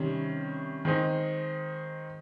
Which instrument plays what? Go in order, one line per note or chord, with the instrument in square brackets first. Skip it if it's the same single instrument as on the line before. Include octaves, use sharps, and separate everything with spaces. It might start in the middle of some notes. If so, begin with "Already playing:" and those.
Already playing: [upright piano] C3 D#3 G3 C#4
D#3 G#3 C4 D#4